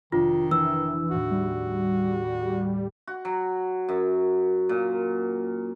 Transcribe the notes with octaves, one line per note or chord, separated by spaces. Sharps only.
F1 D#3 D4 F4 B6
E3 E6
D#2 A2 F#4
G3
F#4
F#3
F#2
A#2